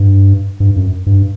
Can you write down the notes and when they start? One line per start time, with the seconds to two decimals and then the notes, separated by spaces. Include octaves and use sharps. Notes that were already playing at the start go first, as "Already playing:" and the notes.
Already playing: G2
0.60 G2
0.76 F#2
1.06 G2